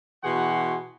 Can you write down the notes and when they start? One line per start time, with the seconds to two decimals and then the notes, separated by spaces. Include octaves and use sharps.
0.23 B2 E3 F#4 G#4 F#5 C6